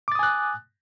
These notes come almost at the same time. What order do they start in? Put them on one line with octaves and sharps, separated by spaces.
D6 A6 D#6 G#5 F#6